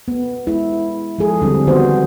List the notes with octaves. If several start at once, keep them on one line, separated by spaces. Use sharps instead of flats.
B3
G#3 E4
F3 G#3 G#4 A4
D3 G3 C4
D#3 B3 F#4 C5